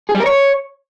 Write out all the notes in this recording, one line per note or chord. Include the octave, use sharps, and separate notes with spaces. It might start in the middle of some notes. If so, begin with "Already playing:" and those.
G#4
G3
A#4
C#5